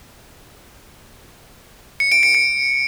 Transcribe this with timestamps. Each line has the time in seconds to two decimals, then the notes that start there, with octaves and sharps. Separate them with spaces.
2.00 C#7
2.12 D7
2.23 C#7
2.35 C#7